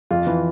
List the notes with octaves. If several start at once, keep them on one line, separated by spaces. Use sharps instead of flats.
F2 F4
E3